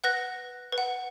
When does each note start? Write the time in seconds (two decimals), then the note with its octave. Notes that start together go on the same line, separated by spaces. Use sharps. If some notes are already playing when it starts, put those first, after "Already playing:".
0.04 B4 F#5 F#6 A#6
0.72 B4
0.78 F#5